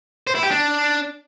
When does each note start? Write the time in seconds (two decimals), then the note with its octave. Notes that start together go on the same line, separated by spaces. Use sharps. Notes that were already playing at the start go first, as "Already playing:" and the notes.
0.27 C5
0.35 E4
0.43 G4
0.51 D4